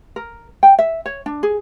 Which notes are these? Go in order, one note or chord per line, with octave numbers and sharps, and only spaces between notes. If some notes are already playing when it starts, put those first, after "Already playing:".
A#4
G5
E5
C#5
D4
G#4